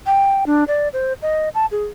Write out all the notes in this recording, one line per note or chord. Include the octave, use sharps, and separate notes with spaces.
G5
D4
D5
C5
D#5
A5
G#4